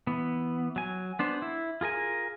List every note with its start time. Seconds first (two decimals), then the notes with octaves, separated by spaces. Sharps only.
0.07 E3 B3
0.76 F#3 G#5
1.19 B3 D4 C5
1.42 E4
1.81 F4 G#4 A#4 G#5